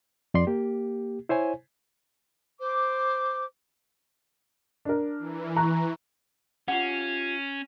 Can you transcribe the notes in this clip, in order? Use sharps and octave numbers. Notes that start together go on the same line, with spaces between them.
F2 D5 C6
A#3 G4
E4 C5 C#5 G#5
C5 D6
D4 A#4
E3
A#5 C#6 F#6
C#4 F4 G4 F#5